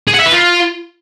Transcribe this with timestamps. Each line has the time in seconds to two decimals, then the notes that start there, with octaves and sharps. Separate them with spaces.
0.08 G#4
0.14 F#5
0.20 E5
0.26 B4
0.32 F4